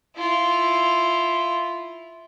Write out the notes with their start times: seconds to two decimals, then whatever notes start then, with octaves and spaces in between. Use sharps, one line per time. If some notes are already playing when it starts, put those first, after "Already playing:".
0.17 E4 F4